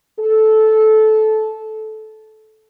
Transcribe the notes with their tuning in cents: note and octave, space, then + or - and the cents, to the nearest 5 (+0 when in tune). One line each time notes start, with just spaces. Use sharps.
A4 -15